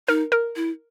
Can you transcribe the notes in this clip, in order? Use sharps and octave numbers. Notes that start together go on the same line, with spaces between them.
D#4 A#4
A#4
E4